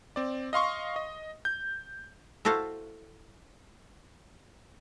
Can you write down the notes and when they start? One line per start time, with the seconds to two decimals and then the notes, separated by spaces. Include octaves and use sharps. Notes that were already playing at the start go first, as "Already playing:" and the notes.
0.16 C4 D5
0.53 D#5 F5 C6 C#6
0.96 D#5
1.45 G6
2.45 E4 F#4 A4 C5 F5